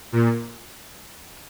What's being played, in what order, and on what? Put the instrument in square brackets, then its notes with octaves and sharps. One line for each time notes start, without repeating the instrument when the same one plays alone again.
[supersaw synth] A#2